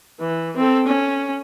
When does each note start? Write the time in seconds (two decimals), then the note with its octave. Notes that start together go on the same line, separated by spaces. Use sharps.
0.20 E3
0.57 C4 A4
0.87 C#4